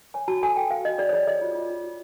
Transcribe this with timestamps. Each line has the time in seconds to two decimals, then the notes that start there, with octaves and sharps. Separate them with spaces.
0.14 C#5 G#5
0.28 F#4 A5
0.42 A4 G#5
0.56 A4 G5
0.70 A4 F5
0.85 F#4 D#5
0.98 G#4 D5
1.09 C#5
1.13 G#4 D5
1.27 G#4 D#5
1.41 F4
1.55 F4
1.70 F4
1.84 F4